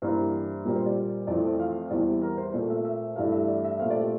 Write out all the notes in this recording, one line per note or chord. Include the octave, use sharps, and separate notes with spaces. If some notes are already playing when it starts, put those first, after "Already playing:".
G2 E3 A#3 C5
A#2 G3 C4 A#4
C5
D5
F2 E3 A3 C4 D5
F5
E2 E3 G3 C4 D5
A#4
C5
A#2 A3 C4 D5
E5
E5
G2 E3 A3 F5
E5
D5
E5
A#2 A3 C4 F5
D5
G4